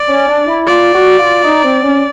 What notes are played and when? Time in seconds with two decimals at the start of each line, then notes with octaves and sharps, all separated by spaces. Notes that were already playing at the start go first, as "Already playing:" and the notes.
Already playing: D5
0.09 C#4
0.28 D4
0.48 E4
0.67 F4 D5
0.94 F#4
1.19 F4
1.45 D#4
1.63 C4
1.83 C#4